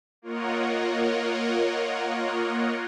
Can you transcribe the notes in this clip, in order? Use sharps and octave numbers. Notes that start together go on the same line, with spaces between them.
A#3 F4 A#4 C#5 D#5 F#5